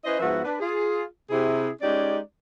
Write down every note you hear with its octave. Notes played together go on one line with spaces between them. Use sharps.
C#4 E4 B4 C5 D#5
G#2 F3 B3 F#4 B4 E5
D4 B4
F4 G#4
C3 E4 G#4
G#3 C#4 D#4 G4 D5